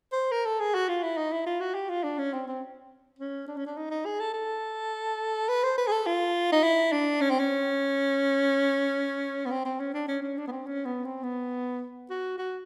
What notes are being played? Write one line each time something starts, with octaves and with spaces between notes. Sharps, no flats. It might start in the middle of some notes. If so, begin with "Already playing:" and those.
C5
A#4
A4
G#4
F#4
F4
E4
D#4
E4
F4
F#4
G4
F4
D4
C#4
C4
C4
C#4
D4
C#4
D4
D#4
D#4
G#4
A4
A4
B4
C5
B4
G#4
A4
F4
D#4
E4
D4
C#4
C4
C#4
B3
C4
C4
C#4
D4
C#4
C#4
D4
B3
C4
C#4
B3
C4
B3
F#4
F#4